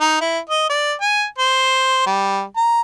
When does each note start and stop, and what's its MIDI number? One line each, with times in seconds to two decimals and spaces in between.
0.01 0.19 63
0.21 0.39 64
0.50 0.65 75
0.69 0.93 74
1.01 1.25 80
1.39 2.05 72
2.07 2.43 55
2.56 2.81 82